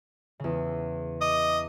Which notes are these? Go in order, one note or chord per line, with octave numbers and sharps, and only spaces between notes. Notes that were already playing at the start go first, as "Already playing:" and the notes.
E2 C#3
D#5 D6